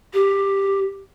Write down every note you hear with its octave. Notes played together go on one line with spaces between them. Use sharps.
G4